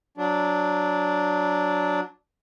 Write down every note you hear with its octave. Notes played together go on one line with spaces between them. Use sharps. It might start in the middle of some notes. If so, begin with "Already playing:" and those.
F#3 D4